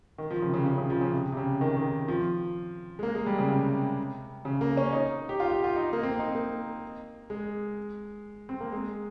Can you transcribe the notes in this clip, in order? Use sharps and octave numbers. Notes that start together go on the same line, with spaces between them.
D#3
F3
C#3
C3
C#3
C#3
C#3
F3
C#3
C3
C3
C#3
D#3
D#3
F3
G#3
A#3
G#3
G3
C#3
C3
C#3
A#3
C#4
D#4
G4
F4
G4
F4
D#4
A#3
C4
D#4
A#3
G#3
C4
A#3
G#3